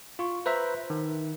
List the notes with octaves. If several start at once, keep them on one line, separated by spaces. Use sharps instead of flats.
F4 C#6
B4 C5 E5 A#5 B5
D#3